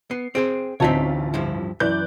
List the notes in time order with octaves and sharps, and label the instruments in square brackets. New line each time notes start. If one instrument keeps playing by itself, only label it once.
[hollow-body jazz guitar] B3 [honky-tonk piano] C7
[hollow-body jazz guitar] C4 G#4 C5 [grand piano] D7
[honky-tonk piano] A1 F4 B6 [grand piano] D2 A5 [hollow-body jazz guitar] C4 D#4 C#5
[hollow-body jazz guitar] G2 F3 E4
[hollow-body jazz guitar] F#2 [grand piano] E3 [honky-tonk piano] D5 F#6 G6